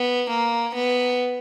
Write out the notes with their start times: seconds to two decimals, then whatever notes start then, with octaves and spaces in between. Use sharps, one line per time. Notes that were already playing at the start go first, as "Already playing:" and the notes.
Already playing: B3
0.30 A#3
0.75 B3